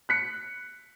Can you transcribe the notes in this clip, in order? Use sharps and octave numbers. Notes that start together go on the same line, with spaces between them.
F#6 B6 C#7